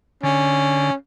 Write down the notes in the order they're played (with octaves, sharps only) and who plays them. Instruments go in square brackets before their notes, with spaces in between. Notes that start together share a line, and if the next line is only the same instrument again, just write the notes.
[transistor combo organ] D3 [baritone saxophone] C#4